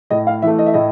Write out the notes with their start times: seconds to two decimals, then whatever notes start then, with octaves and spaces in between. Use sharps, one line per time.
0.10 A2 D#5
0.27 F5
0.42 E3 A3 E5
0.59 D#5
0.66 E5
0.74 A2 D#5